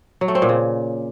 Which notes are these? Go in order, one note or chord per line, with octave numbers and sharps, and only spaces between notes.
F#3
A3
C4
A#2
C#3